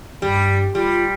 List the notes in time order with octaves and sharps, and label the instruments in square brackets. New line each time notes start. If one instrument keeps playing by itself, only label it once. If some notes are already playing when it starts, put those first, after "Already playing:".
[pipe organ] G2 [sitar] G3
[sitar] G3 [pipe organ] F4